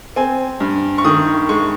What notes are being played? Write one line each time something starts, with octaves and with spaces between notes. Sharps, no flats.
C4 G#5
G2
C#6
D#3 D#6
G#3 C#6